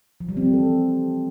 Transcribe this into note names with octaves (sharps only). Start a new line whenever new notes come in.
F3
G3
C4
E3
A4